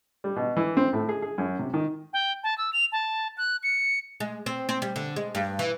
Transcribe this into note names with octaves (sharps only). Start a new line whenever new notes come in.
G3
B2
E3
C4
A2
G#4
G#4
F#2
C3
D#3
G5
A5
E6
F7
A5
F#6
C#7
G#3
C4
C4
G3
D3
G#3
G2
E3